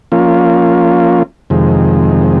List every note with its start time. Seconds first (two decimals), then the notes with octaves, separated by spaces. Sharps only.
0.12 F3 A#3 C#4 F4
1.50 F2 C3 D#3 G#3